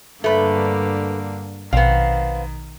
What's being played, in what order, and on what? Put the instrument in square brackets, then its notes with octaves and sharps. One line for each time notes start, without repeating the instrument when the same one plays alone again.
[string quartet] G2 D3 A#3 [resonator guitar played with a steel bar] A3 B4
[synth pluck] A#1 B2 [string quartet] D#3 [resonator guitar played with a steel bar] B3 C4 [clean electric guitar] F5